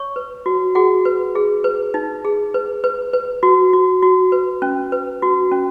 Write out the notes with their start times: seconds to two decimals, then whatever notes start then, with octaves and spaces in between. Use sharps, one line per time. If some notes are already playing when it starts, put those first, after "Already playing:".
Already playing: C#5 C#6
0.16 B4
0.46 F#4
0.75 F#4 G#4 F#5
1.05 B4
1.35 G#4
1.64 B4
1.94 D#4
2.25 G#4
2.54 B4
2.84 B4
3.13 B4
3.43 F#4
3.73 F#4
4.03 F#4
4.32 B4
4.62 C#4
4.92 B4
5.22 F#4
5.52 C#4